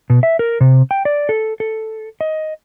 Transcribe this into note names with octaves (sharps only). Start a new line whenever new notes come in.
B2
E5
A#4
C3
G5
D5
A4
A4
D#5